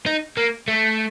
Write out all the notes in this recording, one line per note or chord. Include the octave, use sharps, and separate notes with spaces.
D#4
A#3
A3